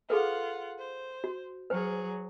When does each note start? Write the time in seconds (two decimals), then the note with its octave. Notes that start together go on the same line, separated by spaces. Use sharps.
0.10 F4 G#4 A4 B4 F#5
0.78 C5
1.24 F#4
1.70 F#3 G#4 B4 C5